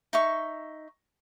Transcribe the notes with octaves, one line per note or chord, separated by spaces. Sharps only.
D#4 E5 C#6